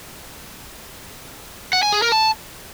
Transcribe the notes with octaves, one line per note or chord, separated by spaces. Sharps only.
F#5
G#5
G#4
A#4
A5